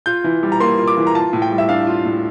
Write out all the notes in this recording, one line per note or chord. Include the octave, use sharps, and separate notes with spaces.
F4 G6
E3
G3
A#5
A#3 C6
F4
D6
E3
A#5
F4 A5
A2
G5
G3
E5
D4 F5
F4
A2